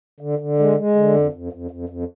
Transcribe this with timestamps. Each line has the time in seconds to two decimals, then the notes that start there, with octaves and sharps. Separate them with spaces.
0.20 D3
0.39 D3
0.59 G#3
0.78 G#3
0.95 D3
1.14 F2
1.33 F2
1.53 F2
1.71 F2
1.89 F2